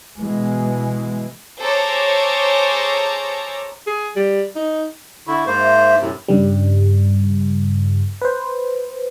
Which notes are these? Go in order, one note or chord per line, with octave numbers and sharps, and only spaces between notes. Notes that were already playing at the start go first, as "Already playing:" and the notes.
B2 E3 G#3
G#4 A4 C5 C#5 A#5 D6
G#4
G3
D#4
D3 E4 C#6
G#2 A#3 C5
E5
F#2 A2 C3
G2 C#3 G3
B4 C5